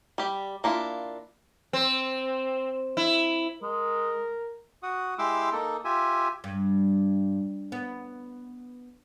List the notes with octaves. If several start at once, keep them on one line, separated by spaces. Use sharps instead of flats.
G3 G4
A#3 D4 E4 F4
C4
E4
G#3 A#4
F#4 F#5 D#6
G#3 E4 G4 C6 D6 E6
A#3 D#4 A4
F4 G4 E5 G#5
G2
B3